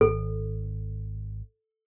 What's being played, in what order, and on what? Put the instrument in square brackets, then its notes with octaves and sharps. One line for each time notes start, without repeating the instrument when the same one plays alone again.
[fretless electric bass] G#1 [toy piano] A4